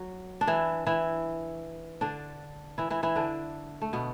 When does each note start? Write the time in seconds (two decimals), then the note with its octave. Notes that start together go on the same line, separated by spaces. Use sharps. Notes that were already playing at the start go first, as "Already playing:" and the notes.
Already playing: F#3
0.41 D4
0.47 E3 E4
0.87 E3 E4
2.01 D3 D4
2.78 E3 E4
2.90 E3 E4
3.03 E3 E4
3.16 D3 D4
3.82 A3
3.93 B2 B3